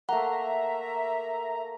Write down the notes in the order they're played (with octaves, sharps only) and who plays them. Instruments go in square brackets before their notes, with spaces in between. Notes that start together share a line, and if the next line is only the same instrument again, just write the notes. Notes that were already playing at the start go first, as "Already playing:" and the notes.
[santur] A3 A#3 [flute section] E5 [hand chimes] F#5 [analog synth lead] A#5